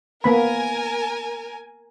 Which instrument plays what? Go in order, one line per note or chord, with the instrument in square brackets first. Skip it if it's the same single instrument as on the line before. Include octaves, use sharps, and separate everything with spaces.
[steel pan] A#3 B3 B5 [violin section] A#4 G#5